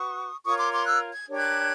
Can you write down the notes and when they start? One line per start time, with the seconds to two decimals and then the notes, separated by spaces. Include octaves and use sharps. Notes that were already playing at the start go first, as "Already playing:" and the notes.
Already playing: F#4 B4 C#6 D#6
0.44 F4 A#4 C#5 C#6 D#6
0.58 C6 D6
0.73 C6 D6
0.86 E6 F#6
1.14 G#6
1.28 D4 G4 A#4 C#5
1.35 F#6 G#6